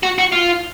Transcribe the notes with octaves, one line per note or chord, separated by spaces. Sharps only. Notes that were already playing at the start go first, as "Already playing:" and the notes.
F#4
F#4
F4